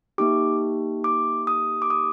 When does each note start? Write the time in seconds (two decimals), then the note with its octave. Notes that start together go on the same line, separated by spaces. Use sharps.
0.18 A#3 D#4 G4 D6
1.04 D6
1.47 D#6
1.82 D6
1.90 D#6